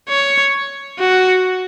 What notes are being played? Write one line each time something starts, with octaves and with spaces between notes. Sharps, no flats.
C#5
F#4